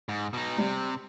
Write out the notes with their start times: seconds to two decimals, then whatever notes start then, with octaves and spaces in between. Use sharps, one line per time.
0.09 G#2
0.33 B2 D#4
0.58 C3 G3